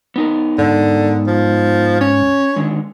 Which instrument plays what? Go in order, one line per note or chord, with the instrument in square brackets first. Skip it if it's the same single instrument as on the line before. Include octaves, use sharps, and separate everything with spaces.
[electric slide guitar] B3 D#4 A#4
[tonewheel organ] G#2 [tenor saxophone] D3
[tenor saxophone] F3
[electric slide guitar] C#4 [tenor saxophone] C#5
[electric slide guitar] D3 D#3 G#3